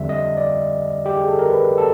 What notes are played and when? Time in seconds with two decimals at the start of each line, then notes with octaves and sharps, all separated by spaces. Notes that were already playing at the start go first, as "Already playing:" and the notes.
Already playing: F2 D3 G3 E5
0.09 D#5
0.37 D5
1.06 G4
1.17 G#4
1.28 A4
1.39 A#4
1.50 B4
1.78 A4